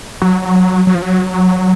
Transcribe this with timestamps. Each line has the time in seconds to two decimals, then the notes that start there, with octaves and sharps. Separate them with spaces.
0.22 F#3
0.87 F#3
0.95 F3
1.02 F#3